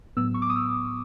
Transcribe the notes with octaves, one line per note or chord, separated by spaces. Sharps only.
A2 F#3 B3 E6
C#6
D6
D#6
E6